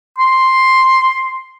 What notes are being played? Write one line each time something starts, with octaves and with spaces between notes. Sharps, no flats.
C6